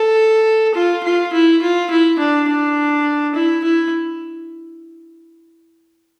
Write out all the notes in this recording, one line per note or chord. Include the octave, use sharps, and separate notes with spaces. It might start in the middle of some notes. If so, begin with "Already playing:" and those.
Already playing: A4
F4
F4
E4
F4
E4
D4
D4
E4
E4